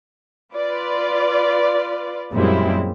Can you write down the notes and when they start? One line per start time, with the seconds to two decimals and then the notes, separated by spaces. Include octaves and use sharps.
0.54 F4 B4 D5
2.32 F#2 A#2 G3 G#3 C4 E4